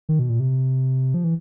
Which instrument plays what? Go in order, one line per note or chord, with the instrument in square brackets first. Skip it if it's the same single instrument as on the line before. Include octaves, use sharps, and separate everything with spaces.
[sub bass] D#3
B2
A#2
C3
F3
E3